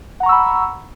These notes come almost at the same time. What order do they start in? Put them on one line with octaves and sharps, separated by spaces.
F#5 A#5 C#6 E6 B5